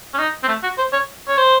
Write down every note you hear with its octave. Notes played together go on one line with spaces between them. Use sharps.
C#4
D#4
C4
A3
F#4
C5
C#5
C#5
C5